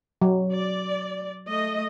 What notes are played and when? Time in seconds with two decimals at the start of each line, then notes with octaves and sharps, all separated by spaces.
0.22 F#3
0.52 D5
1.48 A3 D#5